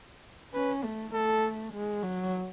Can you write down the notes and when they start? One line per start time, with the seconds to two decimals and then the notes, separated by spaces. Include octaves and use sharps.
0.54 C#4 B4
0.84 A3
1.13 A3 A4
1.73 G#3
2.03 F#3